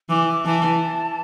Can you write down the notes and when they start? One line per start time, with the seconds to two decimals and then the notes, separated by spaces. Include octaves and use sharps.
0.09 E3 D6
0.27 D6
0.45 E3 A5